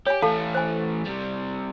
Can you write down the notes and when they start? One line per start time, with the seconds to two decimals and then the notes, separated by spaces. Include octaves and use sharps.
0.07 G4 C#5 G#5
0.23 E3 A3 A4 F5 A5
0.55 C5 G#5
1.04 C3 G3